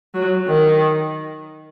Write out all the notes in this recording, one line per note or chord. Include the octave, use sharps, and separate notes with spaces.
F#3
D#3